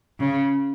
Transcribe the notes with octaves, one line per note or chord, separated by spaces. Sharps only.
C#3